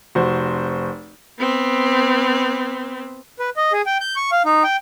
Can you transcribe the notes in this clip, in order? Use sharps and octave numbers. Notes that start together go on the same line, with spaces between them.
F1 F#4 C5
B3 C4
B4
D#5
G#4
G5
G6
C#6
F5
D#4
G5